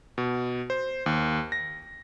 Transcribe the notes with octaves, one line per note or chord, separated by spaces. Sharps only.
B2
C5
D#2
A#6